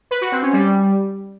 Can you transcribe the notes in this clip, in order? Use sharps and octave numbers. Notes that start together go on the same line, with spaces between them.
B4
F#4
C4
C#4
G3